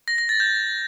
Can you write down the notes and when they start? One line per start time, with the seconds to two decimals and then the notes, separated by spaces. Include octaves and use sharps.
0.08 A#6
0.18 A#6
0.29 A6
0.40 G6